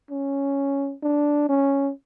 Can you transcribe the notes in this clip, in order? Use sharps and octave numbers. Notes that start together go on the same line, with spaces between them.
C#4
D4
C#4